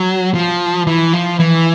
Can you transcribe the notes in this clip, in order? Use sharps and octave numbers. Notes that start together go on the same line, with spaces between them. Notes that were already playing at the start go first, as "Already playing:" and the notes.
Already playing: F#3
F3
E3
F3
E3